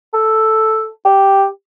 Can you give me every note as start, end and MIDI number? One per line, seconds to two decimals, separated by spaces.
0.14 0.89 69
1.05 1.46 67